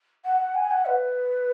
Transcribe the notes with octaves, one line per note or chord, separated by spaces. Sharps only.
F#5
G#5
F#5
B4